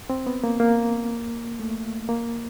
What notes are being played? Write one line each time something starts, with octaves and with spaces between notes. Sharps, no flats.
C4
B3
A#3
A#3
A3
A#3